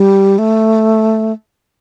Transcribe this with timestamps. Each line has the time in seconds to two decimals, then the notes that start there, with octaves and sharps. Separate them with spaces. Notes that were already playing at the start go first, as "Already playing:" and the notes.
Already playing: G3
0.39 A3